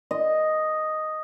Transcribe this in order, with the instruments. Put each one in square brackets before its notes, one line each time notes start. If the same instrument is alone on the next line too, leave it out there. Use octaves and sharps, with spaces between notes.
[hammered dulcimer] D#5